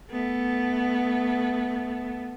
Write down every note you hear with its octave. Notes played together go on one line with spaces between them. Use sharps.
A3 B3